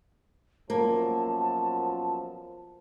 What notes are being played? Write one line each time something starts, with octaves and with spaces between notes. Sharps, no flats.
F#2 B2 F3 A#3 A5